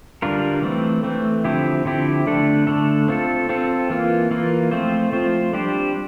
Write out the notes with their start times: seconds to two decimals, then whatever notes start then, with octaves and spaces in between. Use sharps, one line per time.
0.22 D3 G3 D4 F4 A#4
0.63 E3 A3 C4
1.04 E3 A3 C4
1.44 D3 F3 C4 E4 G4
1.85 D3 F3 C4 E4 G4
2.27 D3 A3 D4 A4
2.67 D3 A3 D4 A4
3.08 C4 F4 A4
3.49 C4 F4 A4
3.90 E3 A#3 F4
4.31 E3 A#3 F4
4.71 F3 A3 C4 F4 C5
5.12 F3 A3 C4 F4 C5
5.53 G3 D4 G4 C5